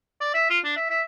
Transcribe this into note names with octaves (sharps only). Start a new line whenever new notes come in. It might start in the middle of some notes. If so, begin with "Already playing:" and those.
D5
E5
F4
D4
E5
E5